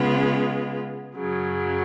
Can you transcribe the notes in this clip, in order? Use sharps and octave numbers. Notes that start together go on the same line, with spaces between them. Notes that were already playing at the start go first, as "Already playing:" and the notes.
Already playing: C#3 G#3 B3 F4
F#2 C#3 F#3